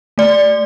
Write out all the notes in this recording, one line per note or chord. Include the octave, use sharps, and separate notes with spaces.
A3 D5